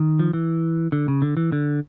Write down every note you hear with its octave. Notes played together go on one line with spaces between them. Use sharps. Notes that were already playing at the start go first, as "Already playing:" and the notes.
Already playing: D#3
F3
E3
D3
C#3
D3
E3
D3